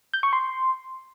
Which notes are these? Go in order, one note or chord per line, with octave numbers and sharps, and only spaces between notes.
G6
C#6
C6